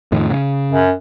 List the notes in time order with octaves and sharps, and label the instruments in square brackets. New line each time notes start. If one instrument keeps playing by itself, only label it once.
[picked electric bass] F2 A2 D#3
C#3
[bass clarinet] F#2